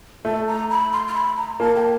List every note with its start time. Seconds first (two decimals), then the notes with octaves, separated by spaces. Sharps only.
0.25 A3 A5
0.48 A#5
0.70 B5
0.93 C6
1.08 C6
1.14 B5
1.37 A#5
1.60 A#3 A5
1.76 G5